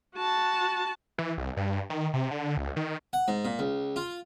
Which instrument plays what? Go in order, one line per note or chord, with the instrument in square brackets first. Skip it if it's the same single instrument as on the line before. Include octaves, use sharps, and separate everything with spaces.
[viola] F#4 A5
[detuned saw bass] E3
C2
G2
D#3
C3
D3
C#2
D#3
[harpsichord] F#5
G#2
A#2
C#2
F4